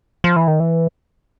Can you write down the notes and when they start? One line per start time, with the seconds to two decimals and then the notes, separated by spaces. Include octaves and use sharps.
0.24 F3
0.36 E3
0.48 D#3
0.60 E3